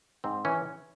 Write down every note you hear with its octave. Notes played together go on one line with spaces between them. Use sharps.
G#2 C4
E3 C#4